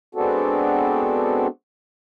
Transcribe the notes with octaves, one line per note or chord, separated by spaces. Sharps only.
G#3 B3 C4 D4 F#4 A4